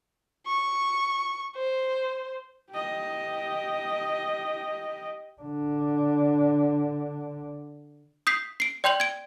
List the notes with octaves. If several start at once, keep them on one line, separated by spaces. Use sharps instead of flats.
C#6
C5
G4 D#5
D3 D4
D#6 G6 B6 C7
C7 D7
D5 G5 C6 G6 F7 F#7
G#6 D7